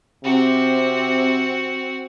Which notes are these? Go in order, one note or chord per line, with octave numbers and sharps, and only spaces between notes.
C3 C4 F#4